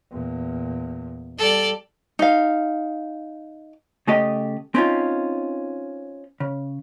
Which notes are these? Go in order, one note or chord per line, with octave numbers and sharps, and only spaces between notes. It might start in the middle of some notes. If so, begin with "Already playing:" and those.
E2 A#2
G3 A4 D5
D#4 F5
C#3 A3 G4 D#5
C4 C#4 D#4 F4
C#3